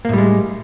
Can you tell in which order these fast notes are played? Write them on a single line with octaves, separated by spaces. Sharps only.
A#3 A2 G3 G#3